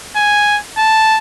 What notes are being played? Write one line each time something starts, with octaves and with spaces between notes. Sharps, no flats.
G#5
A5